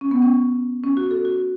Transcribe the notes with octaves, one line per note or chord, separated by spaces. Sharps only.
C#4
B3
C#4
C#4
F#4
A4
F#4